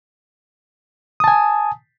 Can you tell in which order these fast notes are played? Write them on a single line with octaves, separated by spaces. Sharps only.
D#6 A5 G#5